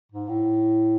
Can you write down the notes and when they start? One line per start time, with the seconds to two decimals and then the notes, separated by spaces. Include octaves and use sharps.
0.11 G#2
0.29 A2